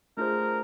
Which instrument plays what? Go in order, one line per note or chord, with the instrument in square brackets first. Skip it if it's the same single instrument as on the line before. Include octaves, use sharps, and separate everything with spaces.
[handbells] A3 D4 F4 G#4 C5 [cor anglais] A#4